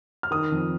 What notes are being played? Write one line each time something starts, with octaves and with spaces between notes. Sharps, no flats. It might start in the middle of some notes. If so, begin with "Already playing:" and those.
F6
D#3 D#6
F2